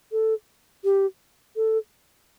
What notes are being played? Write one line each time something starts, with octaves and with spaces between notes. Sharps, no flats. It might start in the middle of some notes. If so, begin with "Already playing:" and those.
A4
G4
A4